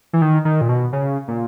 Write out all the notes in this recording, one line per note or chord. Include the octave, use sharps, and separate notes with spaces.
E3
D#3
D#3
A#2
B2
C#3
A#2